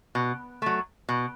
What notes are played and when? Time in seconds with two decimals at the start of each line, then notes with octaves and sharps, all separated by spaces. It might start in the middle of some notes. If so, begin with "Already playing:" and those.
0.15 B2
0.62 F#3 A3
1.09 B2